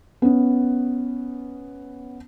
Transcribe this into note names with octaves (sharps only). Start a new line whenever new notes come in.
B3 C#4